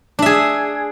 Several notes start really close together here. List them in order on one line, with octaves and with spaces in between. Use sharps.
D4 E5 G#4